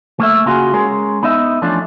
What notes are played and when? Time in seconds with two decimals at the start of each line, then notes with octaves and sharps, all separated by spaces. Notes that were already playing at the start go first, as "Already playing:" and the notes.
0.20 A3 A#3 E5
0.45 C#3 A#3 F4 F#4 G#4
0.73 G#3 C#4 G#4 A#4
1.23 B3 D#4 D#5 E5
1.62 E3 F3 A3 C#4 D4 F4